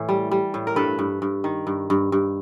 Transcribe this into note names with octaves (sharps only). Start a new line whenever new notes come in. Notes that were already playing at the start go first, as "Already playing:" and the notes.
Already playing: A2 E3
G3
G3
A2
A#4
G2 A4 B4
G2
G2
D#3
G2
G2
G2